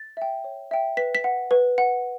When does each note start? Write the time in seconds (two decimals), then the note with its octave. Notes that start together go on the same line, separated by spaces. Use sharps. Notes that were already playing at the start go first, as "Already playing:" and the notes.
Already playing: A6
0.17 E5 G5
0.44 C#5
0.71 E5 G5
0.97 B4 B6
1.15 B6
1.24 F#5
1.51 B4
1.78 F#5